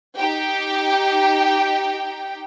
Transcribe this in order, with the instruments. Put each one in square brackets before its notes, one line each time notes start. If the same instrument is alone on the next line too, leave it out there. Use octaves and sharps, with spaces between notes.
[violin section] D#4 G4 G5